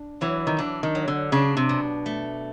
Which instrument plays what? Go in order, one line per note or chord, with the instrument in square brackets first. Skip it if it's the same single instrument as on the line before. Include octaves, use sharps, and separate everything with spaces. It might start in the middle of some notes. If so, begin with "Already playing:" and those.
Already playing: [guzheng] D4
[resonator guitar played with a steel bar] E3 [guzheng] F#3
[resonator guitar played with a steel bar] D#3
[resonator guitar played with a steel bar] E3 [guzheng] D4
[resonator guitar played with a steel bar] D#3
[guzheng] F#3
[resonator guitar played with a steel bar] D3
[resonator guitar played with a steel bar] C#3 [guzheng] D4
[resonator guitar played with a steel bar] C3
[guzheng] B2
A3